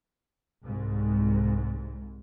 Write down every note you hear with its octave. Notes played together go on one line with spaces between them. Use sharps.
C2 G#2